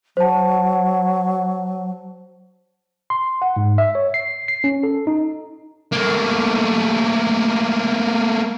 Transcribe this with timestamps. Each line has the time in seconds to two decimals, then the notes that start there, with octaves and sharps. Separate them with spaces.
0.17 F#3 C5 A5
3.10 C6
3.42 F#5
3.56 G#2
3.78 E5
3.95 C#5
4.14 C7
4.48 C7
4.64 C#4
4.83 A4
5.07 D#4
5.93 A3 A#3